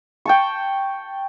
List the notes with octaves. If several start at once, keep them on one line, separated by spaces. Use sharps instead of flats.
G5 A5 C#6